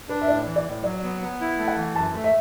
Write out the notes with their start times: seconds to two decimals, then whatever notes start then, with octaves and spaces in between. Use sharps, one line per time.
0.09 D4 B4
0.21 E5
0.28 A2 D5
0.46 E3
0.56 D5
0.66 A2
0.84 F#3 D5
1.03 B3
1.22 B3
1.41 E4
1.59 A3
1.68 F#5
1.77 E3
1.96 F#2 A5
2.14 A3
2.24 E5